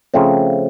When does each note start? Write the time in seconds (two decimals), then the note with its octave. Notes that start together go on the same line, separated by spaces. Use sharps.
0.14 C#3 F3 A3 C4